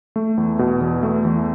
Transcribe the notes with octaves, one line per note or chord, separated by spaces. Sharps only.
A3
E2
B2
E2
A3
E2